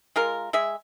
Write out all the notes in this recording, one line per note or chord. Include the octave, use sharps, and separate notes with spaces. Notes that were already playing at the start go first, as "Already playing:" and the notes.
G#3 F4 A#4
G#3 G#4 E5